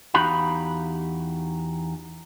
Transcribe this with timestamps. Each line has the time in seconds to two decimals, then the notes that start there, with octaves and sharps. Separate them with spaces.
0.14 E2 D#4 F#4 G4 F5 B5